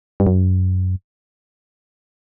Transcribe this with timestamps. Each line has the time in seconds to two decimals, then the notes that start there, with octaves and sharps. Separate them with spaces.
0.20 G2
0.27 F#2